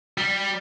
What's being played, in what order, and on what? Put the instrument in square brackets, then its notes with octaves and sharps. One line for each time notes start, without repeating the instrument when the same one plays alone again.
[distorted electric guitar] G3